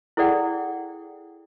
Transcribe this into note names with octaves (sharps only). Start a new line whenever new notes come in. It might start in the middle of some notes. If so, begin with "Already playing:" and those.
E4 G#4 A4 D5 F#5 G5